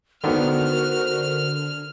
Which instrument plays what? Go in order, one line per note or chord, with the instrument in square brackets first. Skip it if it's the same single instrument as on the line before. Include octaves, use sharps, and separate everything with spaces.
[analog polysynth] D3 [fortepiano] D#3 B3 [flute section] F#4 A#4 C5 [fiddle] F6